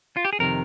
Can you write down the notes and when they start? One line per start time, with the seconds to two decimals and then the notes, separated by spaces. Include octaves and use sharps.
0.17 F4
0.25 G4
0.33 G#4
0.39 F2 C3 D#3 A#4